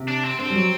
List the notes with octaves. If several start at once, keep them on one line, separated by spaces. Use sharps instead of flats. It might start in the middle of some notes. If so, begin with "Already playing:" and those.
Already playing: C3
D4
C4
D3 C4
G3
F#3